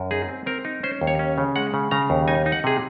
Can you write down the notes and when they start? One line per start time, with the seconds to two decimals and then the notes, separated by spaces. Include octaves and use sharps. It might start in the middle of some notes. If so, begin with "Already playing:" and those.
Already playing: F#2
0.11 D#4 G#4
0.29 C4
0.46 C4 A#4
0.65 D#4
0.83 C#4 C5
1.01 D#2
1.07 C#5
1.19 C#4
1.38 C#3
1.56 G#3 F#5
1.74 C#3
1.91 C#3 A#5
2.10 D#2
2.28 D#4 G#5
2.46 D#4
2.52 F#5
2.64 C3 G#4